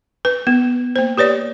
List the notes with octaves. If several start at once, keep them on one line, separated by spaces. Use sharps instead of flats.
B4
B3
A#3 C5
G4 B4 C#5 D5